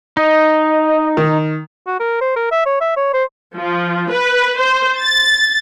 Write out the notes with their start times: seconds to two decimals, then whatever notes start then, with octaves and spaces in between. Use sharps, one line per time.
0.17 D#4 D#5
1.17 D#3
1.87 F#4
2.00 A#4
2.21 C5
2.36 A#4
2.52 E5
2.66 C#5
2.81 E5
2.97 C#5
3.13 C5
3.56 F3
4.11 B4
4.59 C5
4.99 A6